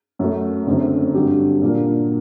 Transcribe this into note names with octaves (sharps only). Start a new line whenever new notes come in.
F#2 F#3 A3
F#1 F#2 D3 A3 C4
G2 D3 F#3 C4 G4
A#2 F#3 A#3 D4